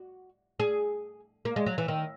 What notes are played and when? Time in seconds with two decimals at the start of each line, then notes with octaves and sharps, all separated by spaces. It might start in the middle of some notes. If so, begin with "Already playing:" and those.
Already playing: F#4
0.60 G#4
1.45 A#3
1.56 G#3
1.66 F#3
1.78 E3
1.88 D#3